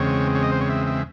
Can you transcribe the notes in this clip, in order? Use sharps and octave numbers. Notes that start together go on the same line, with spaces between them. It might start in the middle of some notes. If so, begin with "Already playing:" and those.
Already playing: E2 C#3 G#3 C4 C#5
C#5
D#5
C5
C#5
E5
E5